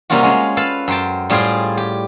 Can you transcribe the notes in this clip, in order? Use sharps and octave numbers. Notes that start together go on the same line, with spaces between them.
C3 G3 A#3 C#4 F4 F#4
G#3 C#4 F4
A4 B4 F5 A5 B5
F#2 C5 G5 A5
A2 G3 F4 G#4 C5 G5
G4